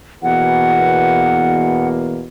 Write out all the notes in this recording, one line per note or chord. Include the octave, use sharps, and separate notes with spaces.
E2 B2 A#3 F#5